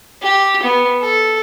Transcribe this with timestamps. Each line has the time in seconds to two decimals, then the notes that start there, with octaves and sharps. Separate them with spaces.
0.22 G4
0.63 B3
1.01 A4